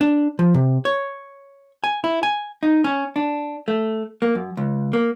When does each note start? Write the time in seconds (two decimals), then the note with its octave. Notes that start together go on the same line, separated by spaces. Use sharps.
0.01 D4
0.39 F3
0.54 C3
0.85 C#5
1.84 G#5
2.04 E4
2.23 G#5
2.63 D#4
2.84 C#4
3.16 D4
3.68 A3
4.22 A#3
4.35 F#2
4.57 C#2
4.93 A#3